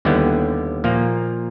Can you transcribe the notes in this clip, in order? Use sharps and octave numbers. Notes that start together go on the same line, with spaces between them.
D#2 D3 G3 B3 E4
A#2 F3 A#3